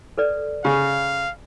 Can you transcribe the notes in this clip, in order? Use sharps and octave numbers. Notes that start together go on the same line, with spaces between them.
A4 B4 D5
C#3 F5